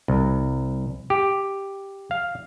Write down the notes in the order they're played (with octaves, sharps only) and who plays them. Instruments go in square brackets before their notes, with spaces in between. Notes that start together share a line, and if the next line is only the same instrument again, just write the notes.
[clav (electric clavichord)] C2
G4
F5